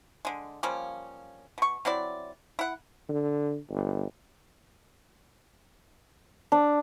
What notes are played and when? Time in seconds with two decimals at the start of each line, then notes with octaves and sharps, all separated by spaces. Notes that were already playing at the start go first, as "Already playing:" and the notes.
0.25 D3 G#3
0.63 F3 G3 A#3 C#4
1.58 B2 C#6
1.85 F#3 C4 E4 D5
2.59 E4 F#5
3.09 D3
3.70 G1
6.52 D4